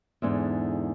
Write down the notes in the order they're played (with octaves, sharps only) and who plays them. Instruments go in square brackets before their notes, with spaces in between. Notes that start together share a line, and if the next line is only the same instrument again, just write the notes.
[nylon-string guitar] E2 G#2 D3